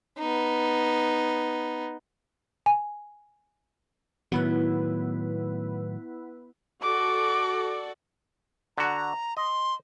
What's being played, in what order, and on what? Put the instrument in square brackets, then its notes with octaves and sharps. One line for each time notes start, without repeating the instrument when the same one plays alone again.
[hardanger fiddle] B3 D#4
[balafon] G#5
[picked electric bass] A2 D#3 F#3 [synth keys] B3 E4 B4
[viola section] F#4 A4 D5 [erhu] D6
[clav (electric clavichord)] D3 F#4 [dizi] A#5
[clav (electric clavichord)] D#5 [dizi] C6